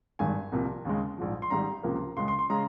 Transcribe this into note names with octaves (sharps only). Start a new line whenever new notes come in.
G#1 G2 D#3 G#3 G#5
C2 C3 F3 A#3
D#2 C#3 G#3
A#1 G#2 F3
C6
G#1 G#2 G3 A#5
C#2 C3 F3 A#3
C#2 C#3 G#3 C6
C6
C6
C#3 G#3 A#5